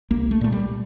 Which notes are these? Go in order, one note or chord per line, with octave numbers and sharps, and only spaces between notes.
C2 A#3
A3
A#2 A3
G3